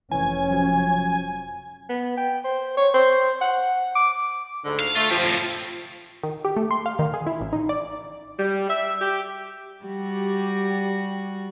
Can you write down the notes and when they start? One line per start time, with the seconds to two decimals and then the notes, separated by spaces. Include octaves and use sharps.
0.11 F1 E3 C#4 G#5
0.51 F3 F#3
1.89 B3
2.17 G5
2.44 C5
2.77 C#5
2.94 C5
3.41 F#5
3.95 D6
4.64 D2 G#2 D3
4.79 F5
4.95 A3 F4
5.11 F3 G4 F5
5.23 F2 A2
6.23 D#3
6.45 G4
6.56 A3
6.71 C6
6.86 F5
6.99 D#3
7.14 G#4
7.26 E4
7.41 A1
7.53 D#4
7.69 D5
8.39 G3
8.69 E5
9.00 G4
9.84 G3 F#4 G4